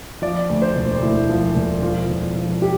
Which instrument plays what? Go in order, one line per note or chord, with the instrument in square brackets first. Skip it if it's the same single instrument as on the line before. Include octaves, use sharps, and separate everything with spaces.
[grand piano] F3 D5
D2
C5
E1
D2 E4
F3
E1
F3 F4
E1
F3
G4